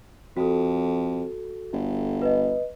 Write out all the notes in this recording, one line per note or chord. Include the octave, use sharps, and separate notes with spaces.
F2 F#4 A4
G1
B4 D#5